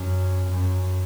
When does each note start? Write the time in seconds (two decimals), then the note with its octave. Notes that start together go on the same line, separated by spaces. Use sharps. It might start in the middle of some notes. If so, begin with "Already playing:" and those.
Already playing: F#2
0.50 F#2